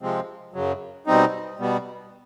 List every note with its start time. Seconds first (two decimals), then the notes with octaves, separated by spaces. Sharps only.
0.02 C3 F3 G#3 C4
0.54 F#2 C#3 F#3
1.07 B2 G3 C4 D#4
1.59 B2 G3 B3